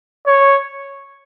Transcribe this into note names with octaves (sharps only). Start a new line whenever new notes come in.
C#5